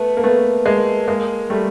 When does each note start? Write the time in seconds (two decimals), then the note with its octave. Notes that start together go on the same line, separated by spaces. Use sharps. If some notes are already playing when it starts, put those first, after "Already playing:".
Already playing: A3 B3
0.17 A#3
0.24 A3 B3
0.65 G#3 A#3
1.08 G#3 A#3
1.50 G3 A3